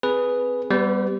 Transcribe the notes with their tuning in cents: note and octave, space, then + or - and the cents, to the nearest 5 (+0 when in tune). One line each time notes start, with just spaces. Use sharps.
C4 +0 G#4 +0 B4 +0
G3 +0 B3 +0 B4 +45